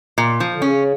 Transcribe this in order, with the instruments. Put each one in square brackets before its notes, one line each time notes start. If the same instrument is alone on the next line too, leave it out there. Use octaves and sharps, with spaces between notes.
[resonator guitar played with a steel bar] A#2
F3
[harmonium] D3
[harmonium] C#3 [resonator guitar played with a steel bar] C#4